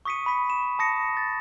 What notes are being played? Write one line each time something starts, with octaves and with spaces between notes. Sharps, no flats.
C#6 D#6 B6 C#7 D#7
B5 B6
E7
A5 D#6 A#6 C#7
A6